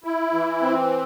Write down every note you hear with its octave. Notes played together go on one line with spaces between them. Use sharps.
E4
E3
C4